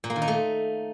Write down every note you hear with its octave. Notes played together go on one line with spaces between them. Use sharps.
A#2
A#3
D#3
D#4
A3